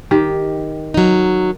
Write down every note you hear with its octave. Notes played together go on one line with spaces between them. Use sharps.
D#3 G4
F#3 D#4